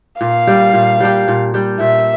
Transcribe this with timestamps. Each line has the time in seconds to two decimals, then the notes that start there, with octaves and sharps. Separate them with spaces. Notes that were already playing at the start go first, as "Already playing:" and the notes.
0.21 A#2 F5
0.47 G3 D4 G4
0.74 A#2
1.00 G3 D4 G4
1.28 A#2
1.54 G3 D4 G4
1.80 A#2 E5